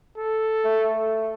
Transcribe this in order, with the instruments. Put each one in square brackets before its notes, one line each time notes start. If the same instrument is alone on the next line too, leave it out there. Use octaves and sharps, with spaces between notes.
[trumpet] A4
[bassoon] A3